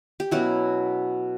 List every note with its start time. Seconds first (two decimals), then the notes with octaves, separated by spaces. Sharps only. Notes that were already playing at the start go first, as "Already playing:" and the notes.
0.20 G4
0.31 B2 F#3 C#4 E4 F#4